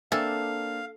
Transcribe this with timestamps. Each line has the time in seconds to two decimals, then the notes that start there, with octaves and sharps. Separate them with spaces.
0.12 A#3 C4 D4 A4 E5 F5 G#5